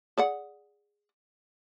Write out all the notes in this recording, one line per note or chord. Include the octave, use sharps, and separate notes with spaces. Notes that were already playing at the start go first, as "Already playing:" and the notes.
G#4 D5 F#5